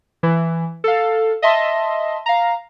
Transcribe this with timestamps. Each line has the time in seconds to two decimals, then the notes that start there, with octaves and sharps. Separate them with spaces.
0.23 E3
0.84 A4 F5
1.42 D#5 E5 A5 C6
2.26 F5 A#5